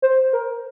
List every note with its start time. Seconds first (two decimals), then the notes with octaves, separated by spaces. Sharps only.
0.02 C5
0.33 A#4